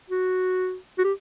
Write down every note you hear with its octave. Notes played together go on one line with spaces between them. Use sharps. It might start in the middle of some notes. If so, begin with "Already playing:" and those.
F#4
F#4
G4